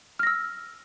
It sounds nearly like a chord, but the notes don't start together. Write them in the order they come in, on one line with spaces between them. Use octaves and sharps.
F6 A#6 E6